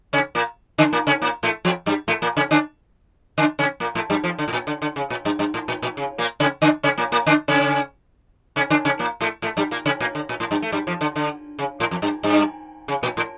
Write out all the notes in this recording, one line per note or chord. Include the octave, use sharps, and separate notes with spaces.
C#3 C#4
A#2 A#3
D3 D4
A#2 A#3
C#3 C#4
A#2 A#3
A2 A3
F2 F3
G2 G3
A2 A3
A#2 A#3
C#3 C#4
D3 D4
D3 D4
C#3 C#4
A#2 A#3
A2 A3
G2 G3
F2 F3
D3
A2
A#2
D3
D3
C#3
A#2
G2
G2
A2
A#2
A#2
C#3
A#2 A#3
C#3 C#4
D3 D4
C#3 C#4
A#2 A#3
A#2 A#3
D3 D4
C#3 C#4
C#3 C#4
D3 D4
C#3 C#4
A#2 A#3
A2 A3
A2 A3
G2 G3
A#2 A#3
C#3 C#4
A#2 A#3
D3
A#2
A2
G2
A3
G2 G3
F2 F3
D3
D3
C#3
A2
F2
G2
G2
C#3
A#2
A2